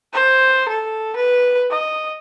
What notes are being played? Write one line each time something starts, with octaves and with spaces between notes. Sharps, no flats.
C5
A4
B4
D#5